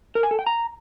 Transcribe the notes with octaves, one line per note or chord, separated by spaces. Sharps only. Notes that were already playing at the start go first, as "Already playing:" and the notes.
A#4
G#5
A4
G5
A#5